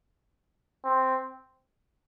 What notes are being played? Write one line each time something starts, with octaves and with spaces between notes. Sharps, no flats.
C4